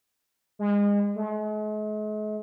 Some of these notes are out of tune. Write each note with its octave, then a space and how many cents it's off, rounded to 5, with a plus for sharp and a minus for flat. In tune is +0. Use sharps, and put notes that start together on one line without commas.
G#3 -30
G#3 +45